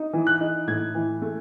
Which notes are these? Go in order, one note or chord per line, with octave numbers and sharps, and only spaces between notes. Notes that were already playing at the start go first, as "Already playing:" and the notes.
Already playing: D#4
E3
F#6
D#4
A2 G#6
E3
A3